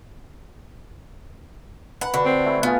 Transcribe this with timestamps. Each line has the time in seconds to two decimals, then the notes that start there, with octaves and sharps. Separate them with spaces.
2.01 B4 F#5 A#5
2.14 D3 F#4 B4
2.25 C4
2.45 A3 E4
2.63 B3 F4 G#4 F5